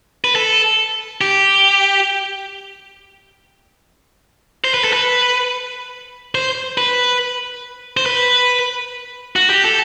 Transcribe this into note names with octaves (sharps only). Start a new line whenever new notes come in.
B4
A4
G4
C5
B4
A4
B4
C5
B4
C5
B4
F#4
G4
A4